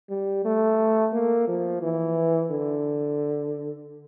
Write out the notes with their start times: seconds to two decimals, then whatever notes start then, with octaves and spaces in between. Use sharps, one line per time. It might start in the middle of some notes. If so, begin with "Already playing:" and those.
0.10 G3
0.45 A3
1.13 A#3
1.48 F3
1.82 E3
2.51 D3